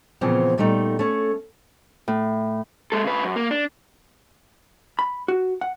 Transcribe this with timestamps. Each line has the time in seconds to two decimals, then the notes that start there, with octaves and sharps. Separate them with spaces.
0.21 A#2 C#3 E3 F3 B3 C4
0.58 A#2 G3 A3 B3 D#4
0.99 A3 C#4
2.08 A2
2.92 G#3 A4
3.05 C#3 B4
3.24 F#2
3.36 A#3
3.51 D4
4.99 B5
5.28 F#4
5.61 F#5